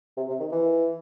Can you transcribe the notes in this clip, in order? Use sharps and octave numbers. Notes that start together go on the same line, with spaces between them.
C3
C3
D#3
E3